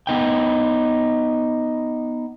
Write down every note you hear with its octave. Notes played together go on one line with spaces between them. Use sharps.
B3 D#4 G5